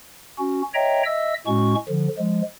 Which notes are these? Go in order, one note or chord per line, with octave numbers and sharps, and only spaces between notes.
C#4 F#4
C#5 D#5 E5 G5 A#5
D#5 E5 E6
A2 G#3 C#4 F#4 C#6
D3 F3
F3 G#3